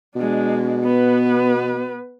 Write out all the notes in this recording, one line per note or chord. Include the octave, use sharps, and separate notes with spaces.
B2 G#3 D4
B3 B4